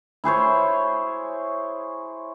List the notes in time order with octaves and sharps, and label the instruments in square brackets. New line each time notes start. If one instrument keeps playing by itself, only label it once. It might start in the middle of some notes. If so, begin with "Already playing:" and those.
[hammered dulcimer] E4 G#4 C5 C#5